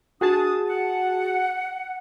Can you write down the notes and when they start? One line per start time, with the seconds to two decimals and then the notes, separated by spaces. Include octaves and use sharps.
0.21 D4 F#4 G#4 A5 D#6
0.69 F#5